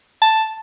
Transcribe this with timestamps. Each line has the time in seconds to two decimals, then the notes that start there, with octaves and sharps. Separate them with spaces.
0.22 A5